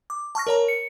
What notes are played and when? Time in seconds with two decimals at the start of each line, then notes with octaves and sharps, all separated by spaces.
0.10 D6
0.35 A5 C#6 F6 A#6
0.47 A#4 C#5 A#5
0.68 C#7